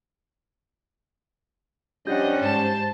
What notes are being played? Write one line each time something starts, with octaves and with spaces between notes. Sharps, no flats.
F3 G3 C#4 D4 G4 D#5 F#5 G6
G#2 C5 A5